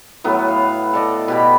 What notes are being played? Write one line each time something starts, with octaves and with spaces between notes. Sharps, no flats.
A2 F#3 B3
F5
A4 D5 D#5
B2 G4 B5